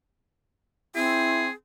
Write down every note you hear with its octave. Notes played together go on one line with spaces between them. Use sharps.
C4 E4 G#4